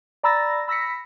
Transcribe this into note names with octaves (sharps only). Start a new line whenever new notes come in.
D5 A#5 B5 E6 A6 A#6
B5 E6 A#6 B6 C#7